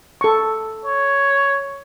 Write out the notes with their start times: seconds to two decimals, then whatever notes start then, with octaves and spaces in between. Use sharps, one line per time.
0.21 A4 C#6
0.85 C#5